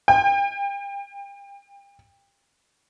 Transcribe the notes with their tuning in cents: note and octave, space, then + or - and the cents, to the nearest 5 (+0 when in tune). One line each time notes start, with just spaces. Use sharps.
G5 +35